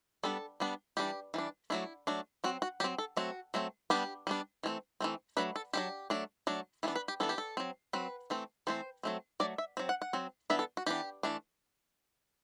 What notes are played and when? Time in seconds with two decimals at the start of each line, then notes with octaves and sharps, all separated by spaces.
0.23 G3 B3 D4 A4
0.60 G3 B3 D4
0.97 E3 G3 D4 G4
1.34 E3 G3 D4
1.70 F#3 A3 D4 E4
2.07 F#3 A3 D4
2.44 F#3 C4 F#4
2.62 F#4
2.80 F#3 C4 G4
2.98 A4
3.17 F#3 A3 C4 F#4
3.54 F#3 A3 C4
3.90 G3 B3 D4 G4
4.27 G3 B3 D4
4.63 E3 A3 C4
5.00 E3 A3 C4
5.37 F#3 A3 D4 B4
5.56 A4
5.73 F#3 A3 D4 G4
6.10 F#3 A3 D4
6.47 F#3 A3 D4
6.83 E3 B3 D4 E4
6.96 B4
7.08 G4
7.20 E3 B3 D4 A4
7.29 G4
7.38 A4
7.57 F#3 C4
7.93 F#3 C4 B4
8.30 E3 A3 C4
8.67 E3 A3 C4 C5
9.03 F#3 A3 C4
9.40 F#3 A3 D5
9.58 E5
9.77 F#3 C4
9.89 F#5
10.02 F#5
10.13 F#3 C4
10.50 E3 B3 D4 E5
10.59 A4
10.77 F#4
10.86 E3 B3 D4 G4
11.23 E3 A3 D4